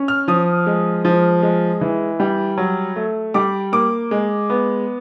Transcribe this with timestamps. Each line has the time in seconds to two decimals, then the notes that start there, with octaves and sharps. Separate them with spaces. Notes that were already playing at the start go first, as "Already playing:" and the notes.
Already playing: C#4
0.08 F6
0.28 F3 D#6
0.67 G#3
1.05 F3
1.43 G#3
1.81 E3
2.20 G3
2.58 F#3
2.96 A3
3.34 G3 D6
3.72 A#3 D6
4.11 G#3
4.50 B3